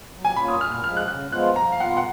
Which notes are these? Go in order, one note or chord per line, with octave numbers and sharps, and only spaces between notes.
F#3
G#5
A#3 C#4 F4 B5
D#6
A#2 F6
F6
F3 G#3 F6
F#6
C#3 F#6
F3 G#3 B3 F4 F#6
F3 A#5
F5
B3 F4 F#5
F#5